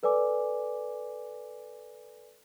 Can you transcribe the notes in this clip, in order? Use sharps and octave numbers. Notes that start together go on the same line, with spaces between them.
A4 B4 D5 G#5 D6